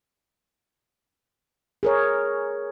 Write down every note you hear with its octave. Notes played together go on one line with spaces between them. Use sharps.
G#4 A#4 C#5